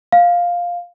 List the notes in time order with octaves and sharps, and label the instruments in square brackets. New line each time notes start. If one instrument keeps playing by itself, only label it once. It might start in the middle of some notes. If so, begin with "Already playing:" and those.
[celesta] F5